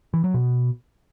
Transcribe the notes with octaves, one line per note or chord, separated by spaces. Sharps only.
E3
F#3
B2